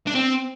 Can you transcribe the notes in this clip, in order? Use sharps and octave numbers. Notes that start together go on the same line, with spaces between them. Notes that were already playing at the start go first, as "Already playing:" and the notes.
D4
C4